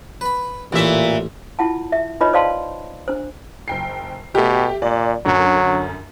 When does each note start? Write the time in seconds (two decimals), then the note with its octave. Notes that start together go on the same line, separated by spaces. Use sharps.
0.21 B4 B5
0.72 A1 A#2 E3 A3 E5
1.59 E4 F4 F#5 A5
1.92 E5
2.21 D#4 F4 B4 C#5 D#5 B5
2.33 C5 D5 D#5 F5 A5 C6
3.08 D4 C5
3.68 F#1 G5 C7
4.35 B2 A3 G4
4.82 A#2 D5
5.26 F#2 D3 F#3